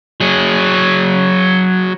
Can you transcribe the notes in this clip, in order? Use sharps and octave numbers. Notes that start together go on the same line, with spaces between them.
F#3 G#4